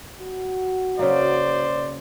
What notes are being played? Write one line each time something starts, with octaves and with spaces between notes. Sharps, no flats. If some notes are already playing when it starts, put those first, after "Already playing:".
F#4
C#3 F#3 A#3 C5 D5